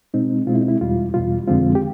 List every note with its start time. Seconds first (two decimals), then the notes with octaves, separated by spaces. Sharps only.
0.14 B2 G#3 C4 D#4
0.47 B2 G#3 C4 F4
0.54 E4
0.61 D#4
0.68 E4
0.81 E2 B2 G3 F4
1.14 E2 B2 G3 F4
1.48 F2 D3 F3 G#3 C4 F4
1.75 G4